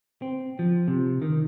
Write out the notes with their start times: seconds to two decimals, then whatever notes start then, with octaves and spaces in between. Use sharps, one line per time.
0.22 C4
0.59 F3
0.88 C3
1.22 D#3